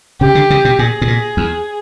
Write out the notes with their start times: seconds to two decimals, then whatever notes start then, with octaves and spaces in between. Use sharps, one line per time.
0.21 C#3 G4
0.35 D3
0.50 C#3
0.65 B2
0.79 A#2 G#4
1.02 A2
1.07 A#2
1.37 E2